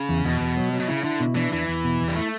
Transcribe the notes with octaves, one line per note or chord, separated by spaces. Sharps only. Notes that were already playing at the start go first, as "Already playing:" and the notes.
Already playing: C#3
E2
E2 B2
E2
F#3
F#3
B2
C#3 E4
D3 E4
B2
E3 D4
E2 E3
E2
B2
E2
G3
A3 E4